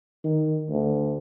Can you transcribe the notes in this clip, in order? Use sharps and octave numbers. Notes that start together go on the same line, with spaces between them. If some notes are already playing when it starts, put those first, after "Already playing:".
D#3
D2